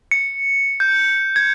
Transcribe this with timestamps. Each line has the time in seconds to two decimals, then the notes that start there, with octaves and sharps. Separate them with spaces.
0.11 C#7
0.80 G6
1.36 G#6